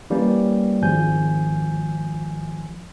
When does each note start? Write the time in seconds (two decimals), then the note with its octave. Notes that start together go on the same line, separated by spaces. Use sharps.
0.10 E3 G3 A#3 C#4
0.82 G#1 F3 G#5 G6